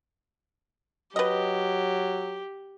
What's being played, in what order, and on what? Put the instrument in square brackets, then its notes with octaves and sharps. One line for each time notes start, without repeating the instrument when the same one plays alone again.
[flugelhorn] F#3 [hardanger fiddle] G4 [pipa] B4 D#5